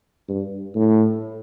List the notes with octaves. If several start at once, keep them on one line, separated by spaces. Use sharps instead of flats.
G2
A2